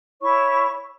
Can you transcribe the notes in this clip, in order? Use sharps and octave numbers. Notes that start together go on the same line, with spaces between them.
E4 C#5 C#6